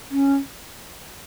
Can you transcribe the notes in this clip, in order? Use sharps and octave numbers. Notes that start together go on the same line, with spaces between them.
C#4